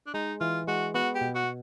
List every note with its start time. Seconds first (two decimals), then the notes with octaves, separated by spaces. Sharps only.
0.07 D4
0.14 G#3 D#4
0.41 E3 F4
0.67 G#3 F#4
0.94 B3 F#4
1.15 G4
1.21 B2
1.35 F#4